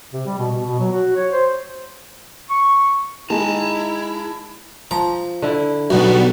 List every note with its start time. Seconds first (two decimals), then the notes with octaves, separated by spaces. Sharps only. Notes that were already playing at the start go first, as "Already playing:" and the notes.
0.13 C3
0.26 G3
0.38 B2
0.51 B2
0.66 B2
0.79 F#3
0.92 F#4
1.16 C#5
1.32 C5
2.50 C#6
3.30 G#3 D#4 E4 A5 A#5
4.91 F3 A#5
5.42 D3 E4
5.90 B1 G3 B3 F#4